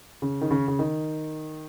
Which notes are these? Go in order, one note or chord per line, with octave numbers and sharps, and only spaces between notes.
C#3
D#3
C#3
C#3
D#3